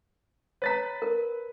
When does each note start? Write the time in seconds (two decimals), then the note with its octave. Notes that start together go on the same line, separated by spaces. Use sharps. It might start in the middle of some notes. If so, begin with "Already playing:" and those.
0.62 B4 C#5 A#5 A6 B6
1.02 A#4